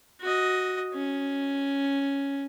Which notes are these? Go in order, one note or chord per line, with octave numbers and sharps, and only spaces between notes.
F#4 D#5
C#4